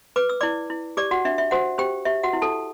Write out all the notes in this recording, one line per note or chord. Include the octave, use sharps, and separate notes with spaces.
B4 D6
E6
E4 D5 D6
E4
G4 D5 D6
F#4 F#5
D4 E5
E5
F#4 C5 F#5
G4 C5 G5
G4 E5
F#4 F#5
E4
A4 A5